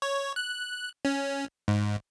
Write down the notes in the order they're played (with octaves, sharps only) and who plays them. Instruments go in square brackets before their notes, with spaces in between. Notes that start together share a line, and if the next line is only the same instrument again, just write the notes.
[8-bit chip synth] C#5
F#6
C#4
G#2